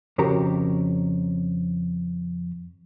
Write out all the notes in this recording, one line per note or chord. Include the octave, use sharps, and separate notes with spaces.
F2 C#3 F#4 G4 A#4 A#5